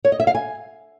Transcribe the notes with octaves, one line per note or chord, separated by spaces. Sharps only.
C#5
D#5
E5
F5
G#5